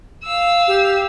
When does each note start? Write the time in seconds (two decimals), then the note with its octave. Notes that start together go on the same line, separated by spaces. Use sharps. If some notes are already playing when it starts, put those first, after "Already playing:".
0.24 F5 E6
0.67 G4